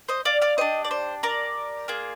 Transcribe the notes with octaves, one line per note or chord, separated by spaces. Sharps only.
C5 D#5
D5 F5
D5 F5
D4 G4 C5 D#5
D5
C5
A#4 D5
A#3 F4 G#4